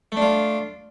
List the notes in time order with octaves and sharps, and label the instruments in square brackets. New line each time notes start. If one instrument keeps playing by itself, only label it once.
[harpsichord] A3
D4
F4